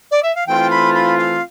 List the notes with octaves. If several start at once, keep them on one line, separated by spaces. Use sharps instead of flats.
D5
E5
F5
E3 A3 C4 F4 G5
B5
B5
F5